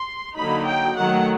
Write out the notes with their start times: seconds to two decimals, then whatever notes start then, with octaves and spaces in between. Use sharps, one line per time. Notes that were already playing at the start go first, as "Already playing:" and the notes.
Already playing: C6
0.36 D3 F#3 A#3 D#4 B5
0.68 G5
0.98 D#3 F#3 A3 F#5